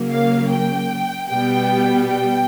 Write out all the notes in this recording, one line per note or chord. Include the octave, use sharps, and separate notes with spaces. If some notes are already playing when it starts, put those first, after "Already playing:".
Already playing: C#3 F#3 A#3
F5
G5
B2 G3 B3 G5
G5